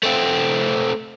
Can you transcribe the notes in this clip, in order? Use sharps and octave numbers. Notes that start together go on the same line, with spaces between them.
A3 C4